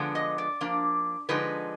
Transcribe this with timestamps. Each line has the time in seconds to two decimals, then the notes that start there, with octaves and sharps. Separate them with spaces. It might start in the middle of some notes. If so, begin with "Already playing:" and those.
Already playing: D3 F3 G#3 B3 D4
0.15 D#5
0.38 D5
0.61 F3 A#3 D4
1.29 D3 F3 G#3 D#4 B4